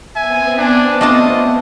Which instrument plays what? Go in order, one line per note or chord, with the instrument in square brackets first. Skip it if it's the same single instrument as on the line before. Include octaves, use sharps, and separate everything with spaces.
[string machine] B3 C4 [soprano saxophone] E5 [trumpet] G#5
[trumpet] D4 [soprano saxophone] G#5
[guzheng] A3 D4 A5 [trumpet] F4 [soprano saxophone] D#5